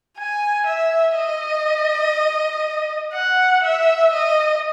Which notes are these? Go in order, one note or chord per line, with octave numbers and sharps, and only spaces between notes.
G#5
E5
D#5
F#5
E5
D#5